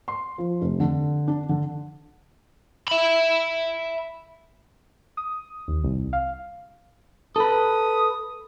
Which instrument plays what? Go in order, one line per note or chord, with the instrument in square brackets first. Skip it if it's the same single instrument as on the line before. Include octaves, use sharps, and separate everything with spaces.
[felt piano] C6
F3
F1
D3
D4
D3
[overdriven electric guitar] E5 B5
[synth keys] D#6
D#2
C2
F5
[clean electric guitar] A4 B4 [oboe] D#6